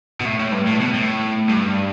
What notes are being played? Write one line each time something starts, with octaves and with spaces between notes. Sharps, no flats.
B2
A2
A2
G2
A2
B2
A2
G2